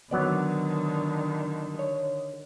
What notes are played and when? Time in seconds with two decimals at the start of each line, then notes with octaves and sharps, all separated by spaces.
0.11 D3 D#3 F#3 B3 D5
1.79 C#5